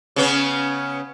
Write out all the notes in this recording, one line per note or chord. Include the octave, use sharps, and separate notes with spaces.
C#3 B3 C#4